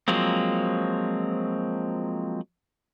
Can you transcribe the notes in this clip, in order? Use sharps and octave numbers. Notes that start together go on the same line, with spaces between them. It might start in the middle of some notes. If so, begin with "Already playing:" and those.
F3 F#3 G#3 A#3 C4